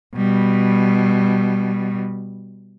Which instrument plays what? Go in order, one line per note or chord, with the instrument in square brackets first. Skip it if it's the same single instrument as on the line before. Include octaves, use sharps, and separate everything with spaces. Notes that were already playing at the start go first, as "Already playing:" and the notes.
[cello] B2 G3